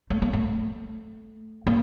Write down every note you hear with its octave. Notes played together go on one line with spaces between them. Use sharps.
A3
A#3
A3
A#3